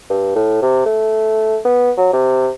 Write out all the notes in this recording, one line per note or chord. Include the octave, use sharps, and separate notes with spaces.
G2
A2
C3
A3
B3
F#3
C3